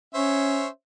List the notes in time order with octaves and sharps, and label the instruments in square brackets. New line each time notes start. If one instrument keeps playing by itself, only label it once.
[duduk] C#4 [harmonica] C5 C#5 E5